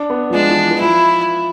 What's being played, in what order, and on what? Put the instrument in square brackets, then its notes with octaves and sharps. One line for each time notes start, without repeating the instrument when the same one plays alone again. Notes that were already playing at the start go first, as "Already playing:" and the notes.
Already playing: [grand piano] D4
B3
F3
[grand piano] G#3 [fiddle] D4
[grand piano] E3
E3
[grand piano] F3 [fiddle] E4